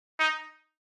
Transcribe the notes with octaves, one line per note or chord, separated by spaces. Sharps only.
D#4